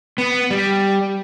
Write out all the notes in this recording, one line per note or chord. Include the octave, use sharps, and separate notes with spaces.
B3
G3